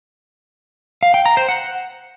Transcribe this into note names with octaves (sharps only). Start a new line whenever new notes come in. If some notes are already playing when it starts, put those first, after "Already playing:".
F5
G5
A#5
C5
F#5